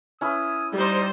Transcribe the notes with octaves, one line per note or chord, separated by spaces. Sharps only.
C#4 E4 B4 D#6
G3 D#4 C5